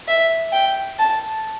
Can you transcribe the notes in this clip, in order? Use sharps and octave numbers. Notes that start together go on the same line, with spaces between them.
E5
G5
A5